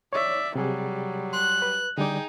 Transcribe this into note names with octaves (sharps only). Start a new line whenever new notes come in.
C#5 D5 E5
C3 F#3 G3 G#4
C6 F#6
B4
D3 G3 D#4 G#4 D5 G5